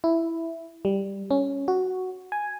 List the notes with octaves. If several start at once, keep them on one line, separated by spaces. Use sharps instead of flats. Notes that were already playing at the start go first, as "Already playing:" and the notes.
E4
G3
C#4
F#4
G#5